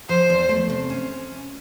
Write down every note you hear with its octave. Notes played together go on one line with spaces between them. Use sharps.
F3 C5
E2
A3
C3
C#4